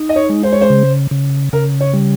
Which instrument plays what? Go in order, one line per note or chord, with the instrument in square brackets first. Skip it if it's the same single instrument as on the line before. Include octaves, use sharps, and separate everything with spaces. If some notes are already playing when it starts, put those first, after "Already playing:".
Already playing: [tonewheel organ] D#4
[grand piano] D#5
C#5
[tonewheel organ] G#3
[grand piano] C5
C#5
C5
[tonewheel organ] C#3
C#3
[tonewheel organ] C#3 [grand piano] A#4
[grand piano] C#5
[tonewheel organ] G3